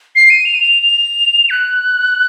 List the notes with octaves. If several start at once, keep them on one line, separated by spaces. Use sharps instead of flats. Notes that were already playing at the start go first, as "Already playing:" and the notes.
C7
D#7
F7
D#7
F7
F7
F#6